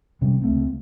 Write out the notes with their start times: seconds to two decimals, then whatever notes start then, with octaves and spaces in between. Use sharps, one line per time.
0.21 D#1 C3 G3 C#4
0.42 C#2 A3 C4